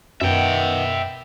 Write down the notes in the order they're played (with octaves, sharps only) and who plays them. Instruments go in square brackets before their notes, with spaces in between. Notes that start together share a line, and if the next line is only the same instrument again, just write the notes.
[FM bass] F#2 [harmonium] D#3 B3 [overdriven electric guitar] E5 G5